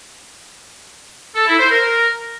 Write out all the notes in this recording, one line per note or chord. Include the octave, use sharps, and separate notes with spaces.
A4
E4
C5
A#4